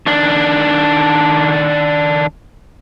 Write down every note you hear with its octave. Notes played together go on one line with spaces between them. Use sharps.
D#3 D4